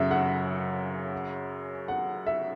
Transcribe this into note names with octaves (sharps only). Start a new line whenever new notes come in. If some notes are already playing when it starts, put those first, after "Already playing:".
Already playing: F#2 C#3 F#3 E5
F#5
F#5
E5